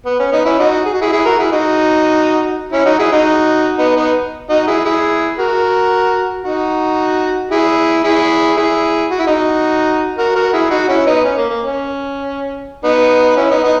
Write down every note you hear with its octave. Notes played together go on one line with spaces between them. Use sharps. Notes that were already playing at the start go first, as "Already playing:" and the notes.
B3
C#4
B3 D#4
C#4 E4
D#4 F#4
G#4
F#4
E4 G#4
E4 G#4
F#4 A#4
E4 G#4
D#4 F#4
C#4 E4
D#4 F#4
E4 G#4
D#4 F#4
B3 D#4
B3 D#4
D#4 F#4
E4 G#4
E4 G#4
F#4 A#4
D#4 F#4
E4 G#4
E4 G#4
E4 G#4
F#4
E4
D#4 F#4
F#4 A#4
F#4 A#4
E4 G#4
D#4 F#4
C#4 E4
B3 D#4
C#4
A#3
A#3
C#4
B3 D#4
C#4 E4
B3 D#4
B3 D#4